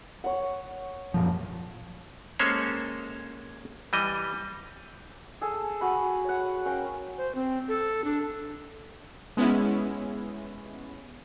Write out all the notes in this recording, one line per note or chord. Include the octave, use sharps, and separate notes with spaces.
C#5 F#5
F#2 A#2 F3
G#3 A#3 C#4 A4 C5 C#5
E3 G3 D#5
G#4 A4 A5
F#4 G#5 B5
C#5 F#5
C#4 A#4 F5 G5
C5
C4
A4
D4
G#3 B3 C#4 E4